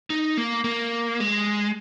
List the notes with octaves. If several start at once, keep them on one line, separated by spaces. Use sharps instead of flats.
D#4
A#3
A#3
G#3